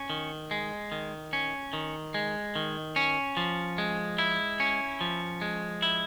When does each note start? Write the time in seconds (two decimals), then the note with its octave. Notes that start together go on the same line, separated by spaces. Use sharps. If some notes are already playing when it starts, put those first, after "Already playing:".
Already playing: C#4
0.10 D#3
0.51 G#3
0.92 D#3
1.33 C#4
1.73 D#3
2.14 G#3
2.56 D#3
2.96 C#4
3.37 F3
3.78 G#3
4.18 E4
4.60 C#4
5.01 F3
5.41 G#3
5.82 E4